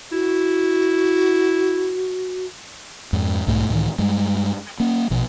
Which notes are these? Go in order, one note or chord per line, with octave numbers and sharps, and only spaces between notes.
E4 F#4
F2 G#2
B1 G#2 A3
C#2 A2 D#3 E3
G2 G3 G#3
A#3 C#4
A#1 B2 F3